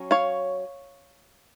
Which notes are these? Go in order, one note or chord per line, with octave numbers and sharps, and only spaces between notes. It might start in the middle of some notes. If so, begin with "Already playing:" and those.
Already playing: F#3 C#4
C#5 F5